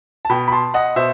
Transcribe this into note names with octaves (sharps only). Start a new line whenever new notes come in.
A5
B2 G5 B5
B5
A5 C6
D#5 F#5
B2 C5 E5